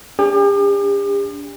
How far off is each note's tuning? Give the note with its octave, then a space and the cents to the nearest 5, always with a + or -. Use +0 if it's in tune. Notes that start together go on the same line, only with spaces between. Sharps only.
D4 -30 G4 +45